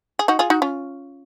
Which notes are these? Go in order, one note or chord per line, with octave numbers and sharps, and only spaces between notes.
G#4
D#4 F#4
F4 G#4
D#4 F#4
C#4 F4